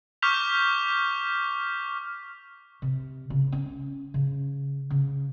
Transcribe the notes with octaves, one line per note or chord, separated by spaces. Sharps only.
C#6 D6 F6 G6 B6 F7
C3
C#3
C#4
C#3
C#3